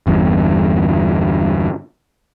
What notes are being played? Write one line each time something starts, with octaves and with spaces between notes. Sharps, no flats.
G1 E2 G2